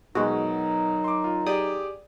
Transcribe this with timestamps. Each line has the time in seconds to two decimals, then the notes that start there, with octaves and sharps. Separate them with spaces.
0.15 B2 D#3 F#3 G#3 D#4 F#4
1.04 C6 D6
1.24 F4
1.47 G4 G#4 D5 D#6